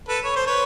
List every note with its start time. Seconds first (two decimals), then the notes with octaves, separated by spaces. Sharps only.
0.08 A4 B4
0.24 C#5
0.36 C5
0.46 B4 C#5